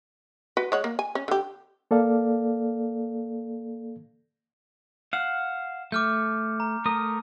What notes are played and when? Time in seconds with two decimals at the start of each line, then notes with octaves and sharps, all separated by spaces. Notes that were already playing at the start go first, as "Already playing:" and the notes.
0.57 F#4 B4
0.72 G#3 C#5 F#5
0.84 A#3
0.99 G#5
1.15 C#4
1.28 D3 G4
1.91 A#3 A4 D5 F5
5.13 F5 F#5 E7
5.92 A3 D6 F6 G6
6.60 A#5
6.86 A3 A#4 D#6